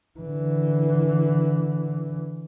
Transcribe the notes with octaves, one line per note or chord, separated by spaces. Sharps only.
D3 E3